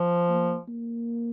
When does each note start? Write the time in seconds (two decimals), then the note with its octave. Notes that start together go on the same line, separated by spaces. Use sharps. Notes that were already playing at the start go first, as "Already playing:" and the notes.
Already playing: F3
0.30 A#3
0.69 A#3